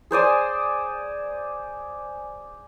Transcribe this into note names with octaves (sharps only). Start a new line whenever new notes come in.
G#4 C5 D5 G#5